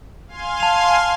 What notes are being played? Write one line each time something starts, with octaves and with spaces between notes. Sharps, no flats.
F5 G#5 C6
A5 F7